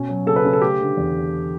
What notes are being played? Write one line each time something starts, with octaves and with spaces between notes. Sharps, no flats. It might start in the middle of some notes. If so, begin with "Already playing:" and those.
Already playing: B2 C#4
F#3
C#3 A4
B4
C#3
A4
A3 G4
D3
E2